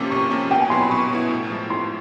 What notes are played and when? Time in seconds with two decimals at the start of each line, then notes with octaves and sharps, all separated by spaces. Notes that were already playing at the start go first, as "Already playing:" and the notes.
Already playing: C3 F3 A#3 C#4 D6
0.10 C3 C#6
0.30 F3 A#3 C#4
0.51 B2 G5
0.60 G#5
0.70 F#3 B3 E4 C6
0.80 B5
0.90 B2 C#6
1.10 F#3 B3 E4
1.30 A2
1.50 F3 G#3
1.70 A2 C6